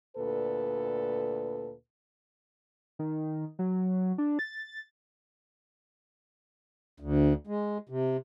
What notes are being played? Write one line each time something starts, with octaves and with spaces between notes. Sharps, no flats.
D2 A#2 A4 B4
D#3
F#3
D4
A6
D2
G#3
C3